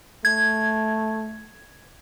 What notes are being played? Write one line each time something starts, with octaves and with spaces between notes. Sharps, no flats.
A3 G#6